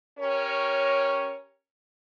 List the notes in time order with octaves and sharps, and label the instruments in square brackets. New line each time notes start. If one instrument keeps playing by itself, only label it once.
[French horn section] C#4 G4 A#4 C#5